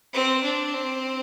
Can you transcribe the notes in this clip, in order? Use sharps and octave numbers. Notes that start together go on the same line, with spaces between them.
C4
D4
C4